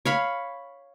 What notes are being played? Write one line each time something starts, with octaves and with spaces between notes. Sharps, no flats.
C#5 F5 B5